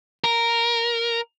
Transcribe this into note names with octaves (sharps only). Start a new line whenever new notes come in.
A#4